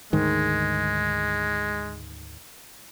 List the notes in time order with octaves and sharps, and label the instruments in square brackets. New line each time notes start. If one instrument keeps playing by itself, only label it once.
[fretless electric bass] D2 G#2 D#3 [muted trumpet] G#3